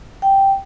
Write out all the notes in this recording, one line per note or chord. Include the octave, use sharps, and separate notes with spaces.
G5